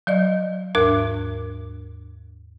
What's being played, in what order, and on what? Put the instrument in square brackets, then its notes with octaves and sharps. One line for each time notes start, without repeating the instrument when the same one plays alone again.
[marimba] F#3 D5 D#5
D#2 G#2 D4 A#4 D6 F#6